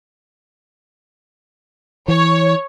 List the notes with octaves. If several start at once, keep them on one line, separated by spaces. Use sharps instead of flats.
E3 C#5